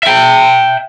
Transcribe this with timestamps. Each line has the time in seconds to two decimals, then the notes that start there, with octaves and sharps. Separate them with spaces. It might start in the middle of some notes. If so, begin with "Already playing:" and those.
0.03 E5 G5